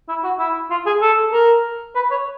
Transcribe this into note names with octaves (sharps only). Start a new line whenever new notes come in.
E4
F#4
E4
F4
G#4
A4
A#4
B4
C#5